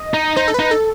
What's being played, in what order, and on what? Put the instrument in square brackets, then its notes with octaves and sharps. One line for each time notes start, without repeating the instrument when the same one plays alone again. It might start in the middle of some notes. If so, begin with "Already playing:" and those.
Already playing: [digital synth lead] D#5
[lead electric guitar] D#4
[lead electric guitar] D#4 [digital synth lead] C5
[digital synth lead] A4
[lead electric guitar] D#4 [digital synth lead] B4
[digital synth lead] A4